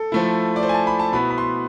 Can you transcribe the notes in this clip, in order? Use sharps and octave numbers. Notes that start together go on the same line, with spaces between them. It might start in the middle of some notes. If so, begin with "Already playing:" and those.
Already playing: A4
F3 A3 E4
D5
C5
G#5
A5
B5
A5
B2 B3 E4 B5
B5
C6